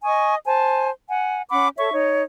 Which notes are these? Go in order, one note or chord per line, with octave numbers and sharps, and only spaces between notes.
D#5 G#5 C#6 D#6
C5 G#5 A5
F#5 G#5
C#4 F#5 B5 D6
A4 C#5 E5 C#6
D#4 C#5